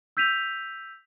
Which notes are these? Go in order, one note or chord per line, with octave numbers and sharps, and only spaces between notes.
E6 G6 B6 D#7 F7